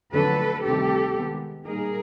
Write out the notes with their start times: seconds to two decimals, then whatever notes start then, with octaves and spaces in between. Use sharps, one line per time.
0.13 F2 D3 F#3 A3 D4 A4 B4
0.64 D2 C3 D#3 G3 C4 G4 A4
1.15 D#3 G#3 B3
1.66 A#2 G3 A#3 D#4 G#4 A#4